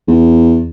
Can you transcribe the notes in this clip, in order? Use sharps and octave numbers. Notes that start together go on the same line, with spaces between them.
E2